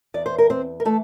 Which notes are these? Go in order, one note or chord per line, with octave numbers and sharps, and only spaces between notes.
E2 E3 D5
C5
A#4
C4 C5
A#4
E3 A3 A4